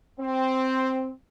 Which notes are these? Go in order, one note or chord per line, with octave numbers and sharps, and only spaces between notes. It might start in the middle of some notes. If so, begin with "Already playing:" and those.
C4